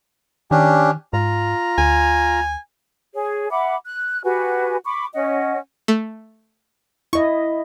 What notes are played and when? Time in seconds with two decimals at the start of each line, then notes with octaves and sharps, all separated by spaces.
0.51 D#3 C#4 D4 G4
1.13 G#2 F4 A#5
1.78 D2 G#5
3.14 G#4 C#5
3.51 E5 F#5 B5 D6
3.86 F#6
4.24 F#4 G4 B4 G#5
4.85 B5 C#6 D6
5.14 C#4 D#5 F#5
5.88 A3
7.13 E4 D#5 C#6